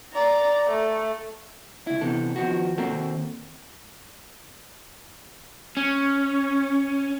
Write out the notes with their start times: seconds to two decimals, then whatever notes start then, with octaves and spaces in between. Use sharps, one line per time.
0.13 D5 A#5
0.71 A3
1.87 C#2 E4
2.01 C3 E3 B3 A4
2.36 D#3 F3 B3 F#4
2.78 D#3 A#3 C4 F#4 A4 A#4
5.77 C#4